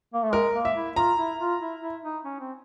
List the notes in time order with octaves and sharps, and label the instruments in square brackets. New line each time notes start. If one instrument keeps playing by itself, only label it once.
[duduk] A#3
A3
[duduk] G#3 [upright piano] A#4
[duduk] A#3
[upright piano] E5
[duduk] E4
[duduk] F4 [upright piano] A#5
[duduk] E4
F4
E4
E4
D#4
C#4
C4